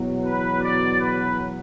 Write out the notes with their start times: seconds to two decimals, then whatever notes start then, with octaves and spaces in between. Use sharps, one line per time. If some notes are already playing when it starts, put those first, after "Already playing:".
Already playing: E2 B2 F#3
0.24 B4
0.62 D5
0.99 B4